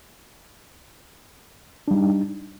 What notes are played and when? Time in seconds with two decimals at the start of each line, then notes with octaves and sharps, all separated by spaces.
1.88 D4
1.91 G3
1.94 D#4